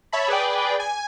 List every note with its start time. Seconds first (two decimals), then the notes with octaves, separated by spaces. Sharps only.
0.12 C#5 E5 A5 B5
0.28 G#4 B4 D5 G5
0.80 G#5